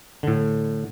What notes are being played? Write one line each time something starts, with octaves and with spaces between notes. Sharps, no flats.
A2 D3